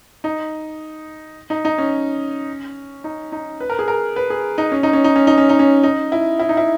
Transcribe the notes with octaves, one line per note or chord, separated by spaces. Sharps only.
D#4
D#4
D#4
C#4
D#4
D#4
B4
A#4
G#4
A#4
B4
G#4
D#4
C#4
D#4
C#4
D#4
C#4
D#4
C#4
D#4
C#4
D#4
E4
E4
D#4
E4